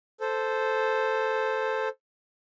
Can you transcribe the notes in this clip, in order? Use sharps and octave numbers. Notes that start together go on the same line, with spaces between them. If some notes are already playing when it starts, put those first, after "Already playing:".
A4 C5